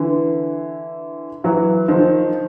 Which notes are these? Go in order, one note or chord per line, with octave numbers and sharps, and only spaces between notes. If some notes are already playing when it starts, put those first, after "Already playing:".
Already playing: D3 E3
E3 F#3
D#3 F3